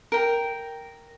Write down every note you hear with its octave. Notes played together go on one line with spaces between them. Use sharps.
A#4 G5